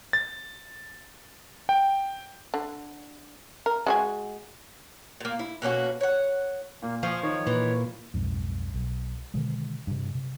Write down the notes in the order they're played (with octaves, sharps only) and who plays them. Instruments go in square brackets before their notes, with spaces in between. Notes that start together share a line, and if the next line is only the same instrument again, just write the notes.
[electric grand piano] A6
G5
[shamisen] D3
A#4
G#3 F#4 G#5
[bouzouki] A#2 A#3
E4
B2 A#3 C#4 F#4
C#5 F#5
[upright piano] A#2 [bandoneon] A#3
[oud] F3 [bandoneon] F5 G#5 C#6
[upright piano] D#3 [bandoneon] C#5
[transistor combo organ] A#2 [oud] E3
[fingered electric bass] B1 F2 G#2
B1
B2 D3 D#3 G#3
G2 C3
C3